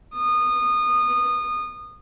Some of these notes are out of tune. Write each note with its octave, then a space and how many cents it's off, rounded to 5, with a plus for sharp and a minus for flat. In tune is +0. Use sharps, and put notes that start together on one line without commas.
D#6 -25